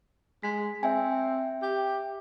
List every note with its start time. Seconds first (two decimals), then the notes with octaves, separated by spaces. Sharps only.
0.43 G#3 B6
0.83 C4 E5 G5 G#5
1.63 G4